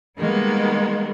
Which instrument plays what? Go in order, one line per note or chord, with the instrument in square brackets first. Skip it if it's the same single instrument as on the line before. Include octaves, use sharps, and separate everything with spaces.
[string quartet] D#3 G3 G#3 A#3 B3